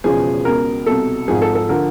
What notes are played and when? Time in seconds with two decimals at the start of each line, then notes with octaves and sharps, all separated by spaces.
0.04 E1 E2 C#3 F3 G#4
0.45 C#2 B2 A#4
0.86 C2 B2 A4
1.28 G#1 G#2 F3 G#4
1.42 A4
1.55 A4
1.69 D3 F3 A#4